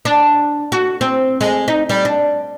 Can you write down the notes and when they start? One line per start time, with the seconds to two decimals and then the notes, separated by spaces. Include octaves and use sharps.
0.05 D4
0.72 F#4
1.01 C4
1.41 G#3
1.68 D#4
1.89 G3
2.05 D4